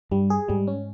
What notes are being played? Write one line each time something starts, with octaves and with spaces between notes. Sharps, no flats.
G2 G3
G#4
G#2 G3
C#4